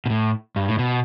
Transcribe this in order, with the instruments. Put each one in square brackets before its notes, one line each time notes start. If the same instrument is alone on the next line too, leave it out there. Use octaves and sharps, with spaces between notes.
[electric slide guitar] B2
A2
G2
A2
B2